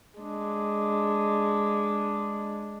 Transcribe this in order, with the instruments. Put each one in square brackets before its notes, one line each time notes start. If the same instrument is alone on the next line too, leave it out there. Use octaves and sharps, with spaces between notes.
[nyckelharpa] G#3 D4